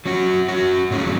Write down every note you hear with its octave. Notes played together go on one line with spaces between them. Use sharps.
F#3 C#4 F#4
F#3 C#4 F#4
G#2 F#3 A3 C#4 G#4